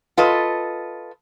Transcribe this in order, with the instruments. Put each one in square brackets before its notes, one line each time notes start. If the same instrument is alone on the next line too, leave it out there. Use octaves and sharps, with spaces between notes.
[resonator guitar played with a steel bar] F4 A4 B4 D#5